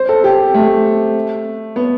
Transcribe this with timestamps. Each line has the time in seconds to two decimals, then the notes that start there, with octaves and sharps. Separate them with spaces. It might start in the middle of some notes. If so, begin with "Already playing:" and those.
Already playing: C5
0.09 A4
0.24 G4
0.54 A3
1.76 B3